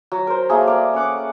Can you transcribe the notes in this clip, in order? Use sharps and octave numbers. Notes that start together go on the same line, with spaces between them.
F#3
A#4 C5
F#3 A3 A#3 G#4
D5 F5
C#4 D5 F#5 D6